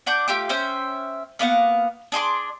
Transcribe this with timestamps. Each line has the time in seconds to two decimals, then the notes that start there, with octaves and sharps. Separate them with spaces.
0.06 D4 F#5 D6 G6
0.28 A3 F4 G4 D6
0.49 C#4 C5 E5 G5
1.39 A#3 B3 F5 F#5
2.12 D4 G#4 C6 D6